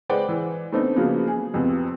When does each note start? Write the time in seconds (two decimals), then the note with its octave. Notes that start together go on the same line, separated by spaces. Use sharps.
0.09 G#3 B4 C5 D5 F#5 G5
0.29 E3
0.72 A3 B3 C4 D4 D#4
0.96 C#3 F3 F#3 A#3 B3
1.28 G#4
1.54 F2 C3 B3